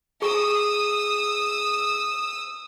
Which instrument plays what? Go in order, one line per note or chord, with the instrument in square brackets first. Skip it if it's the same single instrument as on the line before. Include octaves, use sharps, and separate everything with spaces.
[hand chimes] G#4 C#6 [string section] D#6 E6